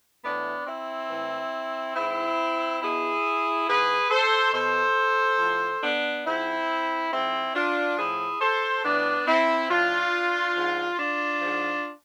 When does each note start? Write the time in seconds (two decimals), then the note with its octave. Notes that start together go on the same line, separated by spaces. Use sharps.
0.23 A2 E3 B3 D4
0.66 C4 E4
1.09 A2 E3
1.95 G#2 E3 C4 E4
2.82 B2 E4 G#4
3.67 G#2 E3 G#4 B4
4.10 A4 C5
4.53 B2 A4 C5
5.39 A2 F3
5.82 B3 D4
6.25 G#2 F3 C4 E4
7.11 G#2 F3 C4 E4
7.55 D4 F4
7.97 A2 F3 E4 G#4
8.40 A4 C5
8.83 A2 E3 B3 D4
9.26 C4 E4
9.69 A2 F3 D4 F4
10.55 G#2 F3
10.98 D4 F4
11.41 G#2 F3